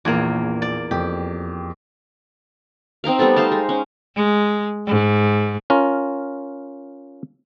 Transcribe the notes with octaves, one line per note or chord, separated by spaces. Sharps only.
A#1 E2 A#3 G#6
D5
F2 G4
C4 D#4 A#4 F5
G3 A3 B3 A4
D#4 C5 F5 A5
G#3
C#4
G#3
G#2
C#4 F4 A#4